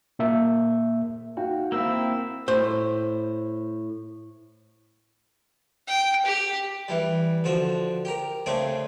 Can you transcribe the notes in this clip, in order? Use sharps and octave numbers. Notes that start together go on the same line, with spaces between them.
A#2 A#3 E5
D#4 F#4 F5 G5
A#3 C4 E4 E6
A2 C5
G5
G4
E3 G3
D3 F3 F#4
G4 A#4
C#3 A3 C4 D4 G#4 D6